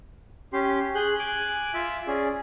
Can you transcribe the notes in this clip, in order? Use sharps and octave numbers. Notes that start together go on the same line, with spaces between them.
C#4 G4 C6
G#4 F#6 G6
G#5 D6 F#6
F4 E5 D6
C#4 G#4 D5